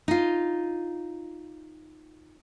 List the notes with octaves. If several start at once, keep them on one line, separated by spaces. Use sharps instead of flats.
D#4 F4